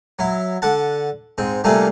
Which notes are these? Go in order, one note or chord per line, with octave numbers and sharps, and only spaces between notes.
F#3 E4
D3 F#5 A5
G#2 C4
C3 G3 A3 A#3 F4 G#4